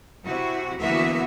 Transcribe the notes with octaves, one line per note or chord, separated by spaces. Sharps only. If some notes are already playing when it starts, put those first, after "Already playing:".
C3 E4 F#4
D2 E3 A#3 B3 F#4 E5